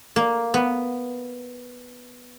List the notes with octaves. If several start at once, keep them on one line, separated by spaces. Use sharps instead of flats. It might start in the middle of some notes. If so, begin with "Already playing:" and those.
A#3
B3